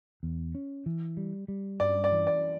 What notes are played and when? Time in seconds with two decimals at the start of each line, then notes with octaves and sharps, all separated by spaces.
0.23 E2
0.55 C#4
0.86 E3
1.17 G3
1.48 G3
1.80 G2 D5
2.04 D5
2.12 E3
2.27 D5